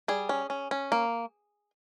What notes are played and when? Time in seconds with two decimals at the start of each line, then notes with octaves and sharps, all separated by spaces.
0.08 G3 G#4
0.29 C#4
0.50 C#4
0.71 C#4
0.92 A#3